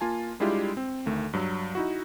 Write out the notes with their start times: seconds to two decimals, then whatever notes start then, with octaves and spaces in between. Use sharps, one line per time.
0.01 A#3 F4 G#5 A5
0.40 G3 G#3 D4 E4 F4 G4
0.77 C4
1.06 D2 D#3 A3
1.33 G2 F#3
1.75 D#4 E4 F#4